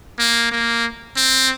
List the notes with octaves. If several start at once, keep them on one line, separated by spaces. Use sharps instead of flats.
A#3
A#3
C4